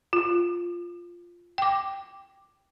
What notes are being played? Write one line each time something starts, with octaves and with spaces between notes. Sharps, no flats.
F4
G5 D6